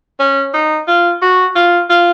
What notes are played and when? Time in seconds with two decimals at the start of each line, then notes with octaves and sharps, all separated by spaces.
0.20 C#4
0.54 D#4
0.88 F4
1.22 F#4
1.56 F4
1.90 F4